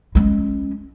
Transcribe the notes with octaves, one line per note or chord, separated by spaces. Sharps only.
G#3 C#4